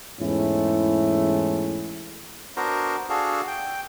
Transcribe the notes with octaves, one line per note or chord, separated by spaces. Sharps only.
E2 G#2 G#3 A3 C#4 E4
B3 D4 F#4 A#4 C5 A#5
D4 F#4 G#4 A4 F5
G5